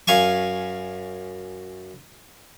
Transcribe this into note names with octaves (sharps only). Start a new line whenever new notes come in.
F#2 F5 G#5 C#6